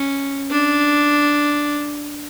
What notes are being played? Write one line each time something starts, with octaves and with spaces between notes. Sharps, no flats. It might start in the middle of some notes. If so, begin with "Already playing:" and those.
Already playing: C#4
D4